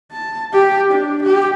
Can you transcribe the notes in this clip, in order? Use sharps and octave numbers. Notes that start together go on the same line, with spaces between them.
A5
G4
D4
G4